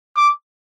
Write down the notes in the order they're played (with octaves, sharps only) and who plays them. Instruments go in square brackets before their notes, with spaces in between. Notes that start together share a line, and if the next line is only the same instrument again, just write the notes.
[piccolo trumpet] D6